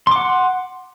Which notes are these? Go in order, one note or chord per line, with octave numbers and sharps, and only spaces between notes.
F#5 C6 D6